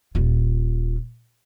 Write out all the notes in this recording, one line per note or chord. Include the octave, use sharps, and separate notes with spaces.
D#1 F4